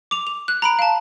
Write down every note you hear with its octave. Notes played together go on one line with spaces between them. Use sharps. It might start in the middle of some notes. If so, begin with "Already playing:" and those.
D6 F7
F7
F#6
A#5 B5 D7
F5 A5